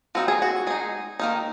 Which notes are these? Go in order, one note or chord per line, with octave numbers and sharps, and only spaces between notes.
F3 C4 D#4 F#4
G#4
F#4
G#3 D#4 G#4
D#3 A#3 D#4